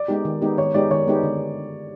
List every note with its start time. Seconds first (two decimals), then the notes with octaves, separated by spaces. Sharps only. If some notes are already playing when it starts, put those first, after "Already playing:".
Already playing: D5
0.08 G#3 B3 D#4 G4
0.25 D#3
0.42 G#3 B3 D#4 G4
0.58 D#3 C#5
0.74 G#3 B3 D#4 G4 D5
0.91 D#3 C#5
1.07 G#3 B3 D#4 G4
1.23 D3